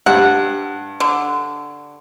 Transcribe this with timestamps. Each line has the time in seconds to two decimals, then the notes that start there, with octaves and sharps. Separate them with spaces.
0.06 G2 F#5
1.00 D3